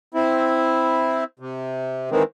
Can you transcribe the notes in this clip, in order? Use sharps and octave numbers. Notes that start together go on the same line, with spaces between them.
C4 E4
C3
D#3 E3 G#3 A#3 C4